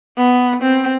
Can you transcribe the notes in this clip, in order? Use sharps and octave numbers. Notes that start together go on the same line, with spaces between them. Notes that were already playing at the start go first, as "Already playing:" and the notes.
B3
C4